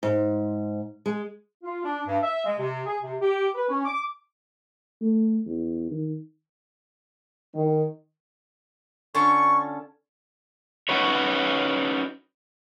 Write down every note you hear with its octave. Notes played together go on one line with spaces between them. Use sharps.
G#2
G#3
F4
D4
G2
E5
G#3
C3
G#4
C3
G4
B4
C#4
D6
A3
E2
D#3
D#3
D3 C#4 F4 C#6
C#4 D#4 F#4 B4 C#5